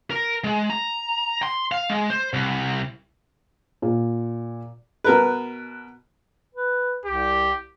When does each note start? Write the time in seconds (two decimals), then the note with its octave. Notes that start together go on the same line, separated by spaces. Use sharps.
0.11 A#4
0.44 G#3
0.70 A#5
1.43 C6
1.72 F5
1.90 G#3
2.10 C5
2.33 C2
3.82 A#2
5.04 B2 A#4 B4
6.55 B4
7.05 C2 G4